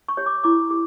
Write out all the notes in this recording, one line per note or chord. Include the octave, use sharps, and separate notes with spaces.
C#6
G4 C#5
D6
E4 D6
G4 D6